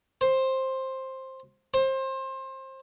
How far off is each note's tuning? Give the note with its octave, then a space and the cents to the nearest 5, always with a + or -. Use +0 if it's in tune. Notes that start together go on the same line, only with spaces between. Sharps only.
C5 +10
C5 +25